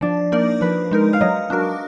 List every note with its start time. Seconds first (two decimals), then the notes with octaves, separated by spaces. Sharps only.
0.01 F3 D4
0.32 A#3 D#4 A#4 D5
0.61 F3 B4
0.91 G#3 D#4 A#4
1.13 F5
1.21 F#3 D#5
1.50 D4 F#4 A#4